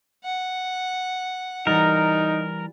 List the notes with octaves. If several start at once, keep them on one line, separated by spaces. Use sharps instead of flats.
F#5
E3 G3 D#4 A#4